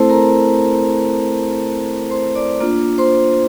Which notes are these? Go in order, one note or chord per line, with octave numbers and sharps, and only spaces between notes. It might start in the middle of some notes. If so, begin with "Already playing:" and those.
Already playing: A3 C4 E4 A4 C5 A5 C6
A#4 A#5
C5 C6
D5 D6
A#3 D4 F4
C5 C6